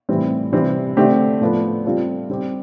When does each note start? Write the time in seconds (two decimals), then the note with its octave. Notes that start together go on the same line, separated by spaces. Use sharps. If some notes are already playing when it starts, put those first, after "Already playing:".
0.09 A2 E3 G3 C4
0.52 C3 E3 G3 C4
0.97 D3 A3 C4 G4
1.41 A2 F3 B3 D4 A4
1.85 G3 C4 F4 A4
2.30 G3 C4 G4